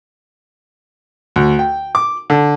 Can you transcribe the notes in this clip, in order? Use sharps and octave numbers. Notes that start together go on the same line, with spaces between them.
D2
G5
D6
D3